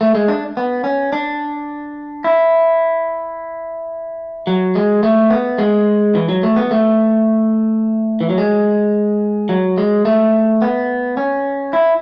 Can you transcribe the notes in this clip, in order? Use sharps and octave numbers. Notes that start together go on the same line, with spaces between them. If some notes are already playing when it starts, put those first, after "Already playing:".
A3
G#3
D4
B3
C#4
D4
E4
F#3
G#3
A3
B3
G#3
E3
F#3
A3
B3
A3
E3
F#3
G#3
F#3
G#3
A3
B3
C#4
E4